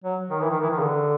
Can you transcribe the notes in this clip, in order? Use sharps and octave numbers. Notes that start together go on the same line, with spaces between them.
F#3
D#3
E3
D#3
E3
D#3
C#3
D3